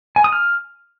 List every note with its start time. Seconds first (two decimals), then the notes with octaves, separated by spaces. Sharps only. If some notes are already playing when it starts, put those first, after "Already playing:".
0.16 G#5
0.24 D#6
0.32 F6